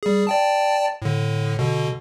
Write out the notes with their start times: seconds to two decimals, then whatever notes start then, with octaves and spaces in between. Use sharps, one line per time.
0.03 G3 G#4
0.27 D5 G5 A5
1.02 A2 D3
1.59 B2 D3